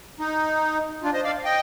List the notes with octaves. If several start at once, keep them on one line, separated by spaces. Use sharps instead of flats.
D#4
D4 F4
C5 D#5
D5 F5
D#5 G5